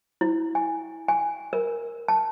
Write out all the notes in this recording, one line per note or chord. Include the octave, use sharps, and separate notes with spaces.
E4
G#5
G#5
A#4
A5